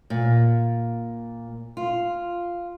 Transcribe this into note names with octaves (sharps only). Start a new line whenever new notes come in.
A#2
F4